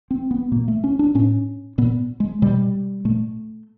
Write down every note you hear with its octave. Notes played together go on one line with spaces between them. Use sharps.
C4
B3
A#2 A#3
A3
C#4
D4
A2 C#4
A#2 B3
G#3
B2 G3
A#2 A3